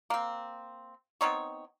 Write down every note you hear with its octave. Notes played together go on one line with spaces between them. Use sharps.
A#3 C4
B3 C4 D#4 C#5